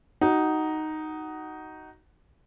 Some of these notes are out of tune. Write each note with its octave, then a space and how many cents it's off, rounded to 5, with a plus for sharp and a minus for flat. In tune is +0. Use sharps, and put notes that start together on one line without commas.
D#4 +0 F#4 +20